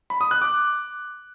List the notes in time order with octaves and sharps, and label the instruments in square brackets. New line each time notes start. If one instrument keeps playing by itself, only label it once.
[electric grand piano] B5
D#6
F#6
D6